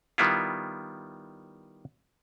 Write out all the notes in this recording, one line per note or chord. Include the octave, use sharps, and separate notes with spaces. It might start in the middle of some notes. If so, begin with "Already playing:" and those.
D#3 G3 B3 E4 F4